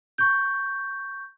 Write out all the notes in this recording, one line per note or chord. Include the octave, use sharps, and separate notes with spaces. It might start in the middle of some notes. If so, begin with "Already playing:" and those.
C#6 G6